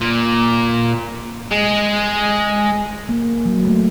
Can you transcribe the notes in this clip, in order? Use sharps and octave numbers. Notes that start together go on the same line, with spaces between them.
A#2
G#3 G#4
A#3
F#3
A3